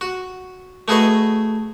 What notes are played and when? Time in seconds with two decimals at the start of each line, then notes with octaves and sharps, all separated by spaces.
0.01 F#4
0.88 A3 F#4 G#4 B4 D#5